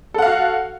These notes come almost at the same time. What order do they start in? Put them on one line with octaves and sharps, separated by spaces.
A4 F#5 F5 F#4